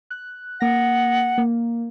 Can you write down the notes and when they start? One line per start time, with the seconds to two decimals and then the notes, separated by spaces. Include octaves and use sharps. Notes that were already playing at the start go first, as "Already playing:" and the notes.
0.10 F#6
0.60 A#3 F#5 A#6
1.38 A#3